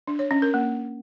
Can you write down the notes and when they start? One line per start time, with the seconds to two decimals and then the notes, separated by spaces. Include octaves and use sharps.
0.08 D4
0.19 C#5
0.31 C#4
0.42 A#4
0.54 A#3